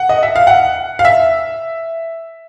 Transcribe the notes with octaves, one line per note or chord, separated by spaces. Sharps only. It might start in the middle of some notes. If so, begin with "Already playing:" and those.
Already playing: F#5
D#5
E5
F5
F#5
F5
E5